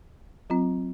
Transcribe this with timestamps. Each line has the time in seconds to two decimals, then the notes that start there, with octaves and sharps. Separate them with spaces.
0.50 F#3 C4 F4